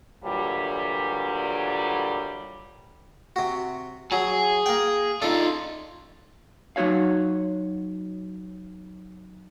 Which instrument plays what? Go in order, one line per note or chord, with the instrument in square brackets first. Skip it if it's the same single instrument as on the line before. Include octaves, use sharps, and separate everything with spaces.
[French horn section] A#2 D3 E3 F#3 G3
[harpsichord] C3 F#4
[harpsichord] F#3 [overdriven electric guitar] G#4
[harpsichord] A#3 G5
[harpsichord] D4 A4 [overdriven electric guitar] D#4 F4
[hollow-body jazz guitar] F#3 D#4 F#4 C#5 F5